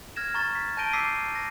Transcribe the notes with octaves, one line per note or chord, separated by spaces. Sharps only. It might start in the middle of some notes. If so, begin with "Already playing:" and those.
F6 G#6 A#6 E7
A#5 C#6 A6
B6
A5 G6 A#6 D7 D#7 G7
D6 E6 B6 C7 D#7
A#6